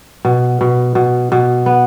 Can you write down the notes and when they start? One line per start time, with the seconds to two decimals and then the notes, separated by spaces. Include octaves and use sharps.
0.25 B2
0.61 B2
0.95 B2
1.32 B2
1.66 B3